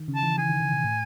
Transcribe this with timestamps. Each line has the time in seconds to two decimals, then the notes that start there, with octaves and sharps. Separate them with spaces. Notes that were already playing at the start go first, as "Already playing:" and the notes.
Already playing: D#3
0.08 C#3
0.15 A5
0.23 E3
0.38 E3 G#5
0.49 D#3
0.61 C#3
0.72 B2
0.84 A2